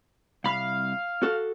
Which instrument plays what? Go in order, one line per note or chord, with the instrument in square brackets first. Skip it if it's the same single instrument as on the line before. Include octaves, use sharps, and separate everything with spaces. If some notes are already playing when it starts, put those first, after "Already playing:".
[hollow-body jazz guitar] C2 B5 [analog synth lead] F5
[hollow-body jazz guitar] F#4 A4